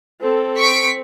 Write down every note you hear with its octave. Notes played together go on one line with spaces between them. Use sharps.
C4 A4
C#6 B6 D7